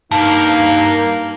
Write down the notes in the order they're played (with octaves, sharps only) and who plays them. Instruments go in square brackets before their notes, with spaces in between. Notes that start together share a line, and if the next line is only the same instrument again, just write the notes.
[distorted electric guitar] G2 [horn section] A#3 [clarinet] D#4 [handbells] A5